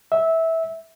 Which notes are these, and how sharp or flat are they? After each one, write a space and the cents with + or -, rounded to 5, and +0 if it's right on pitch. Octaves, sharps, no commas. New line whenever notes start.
E5 -15